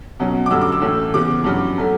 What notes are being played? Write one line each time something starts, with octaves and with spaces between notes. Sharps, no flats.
B2 F#3 C#4
D6
G2 D3 F#3 C#4 E6
D6
E6
A2 E3 A3 C#4
C#3 E3 B3 D6
G2 F#3 C#4
F#3 A3 C#4